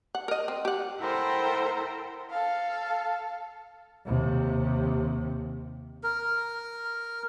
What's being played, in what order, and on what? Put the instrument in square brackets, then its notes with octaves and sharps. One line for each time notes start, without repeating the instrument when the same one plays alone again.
[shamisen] F#5
A#4 D#5
C4
G4 F#5
[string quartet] E4 A4 A#4 C5 F#5 G5
A4 F5
[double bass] D#2 C3
[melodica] A#4